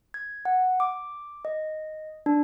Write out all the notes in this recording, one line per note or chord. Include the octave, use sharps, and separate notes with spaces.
G#6
F#5
D6
D#5
D4